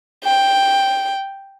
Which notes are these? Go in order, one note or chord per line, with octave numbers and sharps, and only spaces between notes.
G5